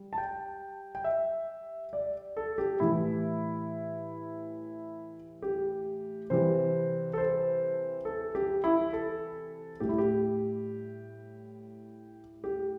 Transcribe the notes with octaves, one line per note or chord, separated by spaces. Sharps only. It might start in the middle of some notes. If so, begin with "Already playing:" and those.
Already playing: G3
A5
G5
G5
E5
D5
A4
G4
A2 E3 G3 E4
G4
C3 E3 G3 C5
A4
C5
A4
G4
E4
A4
A2 G3 G4
E4
G4
G4